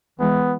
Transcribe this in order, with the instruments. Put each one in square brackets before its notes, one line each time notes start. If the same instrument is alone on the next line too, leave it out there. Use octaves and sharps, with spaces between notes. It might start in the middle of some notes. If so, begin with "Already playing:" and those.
[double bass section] E3 G#3 [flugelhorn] B3